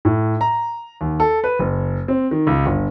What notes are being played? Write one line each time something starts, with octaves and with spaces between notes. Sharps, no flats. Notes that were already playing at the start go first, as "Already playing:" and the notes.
A2
A#5
D#2
A4
B4
F#1
C4
D#3
C#2
G1